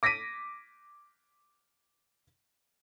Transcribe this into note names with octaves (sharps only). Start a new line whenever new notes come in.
D6 A#6 B6 D7 D#7